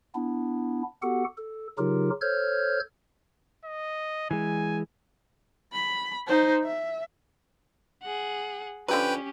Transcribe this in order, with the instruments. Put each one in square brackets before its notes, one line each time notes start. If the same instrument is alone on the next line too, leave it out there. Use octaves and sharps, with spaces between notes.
[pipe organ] B3 D4 E4
B3 F#4 G4 A4 F#5
A4
C#3 F#3 D#4 F4 G4 A#4
A4 C5 C#5 F6 G6 G#6
[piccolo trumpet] D#5
[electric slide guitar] E3 G#3 [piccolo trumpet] G#5
[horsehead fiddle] B5
D#4 C5
E5
[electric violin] G#4 F#5
[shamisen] D3 F3 F#3 [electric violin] C#4 G4 [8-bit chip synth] B4 G5